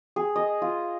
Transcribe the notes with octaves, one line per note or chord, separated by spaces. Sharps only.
G#4
D#5
F4